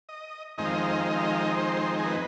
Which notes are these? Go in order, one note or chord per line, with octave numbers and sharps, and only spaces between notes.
D#5
F2 D#3 G#3 C4 D#4 D#5
F5
D#5
F5
D#5
F5
D#5
F5
D#5
F5
D#5
C5
G#4
B4